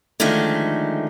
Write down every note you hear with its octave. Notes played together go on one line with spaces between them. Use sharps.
D3 D#3 F3 G#3 A3